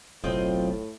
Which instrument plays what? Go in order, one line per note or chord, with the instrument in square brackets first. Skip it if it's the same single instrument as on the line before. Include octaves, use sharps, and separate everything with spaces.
[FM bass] F#1 [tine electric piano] B1 F#3 C5 [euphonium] A2 [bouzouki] C4 F4 D#5